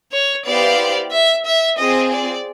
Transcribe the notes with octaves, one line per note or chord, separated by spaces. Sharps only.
C#5
B3 E4 G4 C5 D5 F5
E5
E5
C4 F4 G#4 D#5
D5